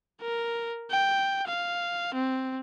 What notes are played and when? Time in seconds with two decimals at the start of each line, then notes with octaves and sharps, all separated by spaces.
0.21 A#4
0.91 G5
1.48 F5
2.14 C4